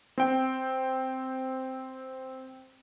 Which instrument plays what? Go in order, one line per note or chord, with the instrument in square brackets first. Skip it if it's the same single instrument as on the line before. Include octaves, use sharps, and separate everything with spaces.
[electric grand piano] C4 G5